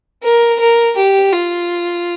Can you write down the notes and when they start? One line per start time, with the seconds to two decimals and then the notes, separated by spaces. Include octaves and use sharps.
0.23 A#4
0.60 A#4
0.96 G4
1.32 F4